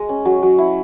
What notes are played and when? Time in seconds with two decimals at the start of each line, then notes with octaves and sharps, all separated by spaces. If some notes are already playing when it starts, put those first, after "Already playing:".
Already playing: G#3 D#5
0.09 C#4
0.25 F#3
0.43 F#3
0.58 E4